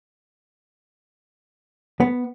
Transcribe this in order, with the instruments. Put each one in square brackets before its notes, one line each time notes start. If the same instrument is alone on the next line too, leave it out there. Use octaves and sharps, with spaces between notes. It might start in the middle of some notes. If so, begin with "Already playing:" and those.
[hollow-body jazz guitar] B3